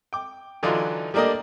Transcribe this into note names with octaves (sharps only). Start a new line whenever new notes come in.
G5 D6
D3 E3 F#3 D4 D#4 F4
G3 A3 A#3 D4 A#4 D#5